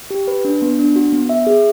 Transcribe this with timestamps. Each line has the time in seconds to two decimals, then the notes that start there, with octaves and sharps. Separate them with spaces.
0.10 G4
0.28 B4
0.45 D4
0.62 B3
0.79 D4
0.96 F#4
1.13 B3
1.29 E5
1.47 G#4